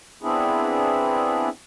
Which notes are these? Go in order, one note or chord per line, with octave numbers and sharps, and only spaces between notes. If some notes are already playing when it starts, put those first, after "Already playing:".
B3 C4 D4 E4 G#4